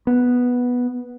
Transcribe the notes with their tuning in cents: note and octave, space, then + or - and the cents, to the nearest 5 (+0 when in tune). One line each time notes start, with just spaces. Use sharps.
B3 -5